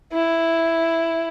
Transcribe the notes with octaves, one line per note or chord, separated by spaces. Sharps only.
E4